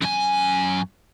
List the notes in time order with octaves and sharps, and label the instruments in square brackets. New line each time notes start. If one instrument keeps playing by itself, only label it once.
[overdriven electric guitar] F#2 G#5